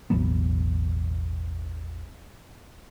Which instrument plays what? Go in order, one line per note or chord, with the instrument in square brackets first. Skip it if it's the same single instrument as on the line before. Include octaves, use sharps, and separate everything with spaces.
[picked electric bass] E1 A1 F#3 B3